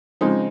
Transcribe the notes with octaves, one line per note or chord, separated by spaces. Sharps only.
C#3 F3 G#3 C4 D#4